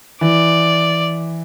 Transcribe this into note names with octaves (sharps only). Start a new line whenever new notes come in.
E3 D5